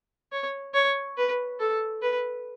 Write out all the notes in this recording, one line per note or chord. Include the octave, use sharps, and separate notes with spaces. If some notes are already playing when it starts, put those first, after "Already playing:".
C#5
C#5
B4
A4
B4